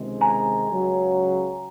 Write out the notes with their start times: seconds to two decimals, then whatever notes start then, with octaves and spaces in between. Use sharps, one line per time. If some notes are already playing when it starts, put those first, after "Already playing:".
Already playing: C#2 C3 D#3 G#3
0.21 G#5 A#5
0.68 C#2 C#3 F#3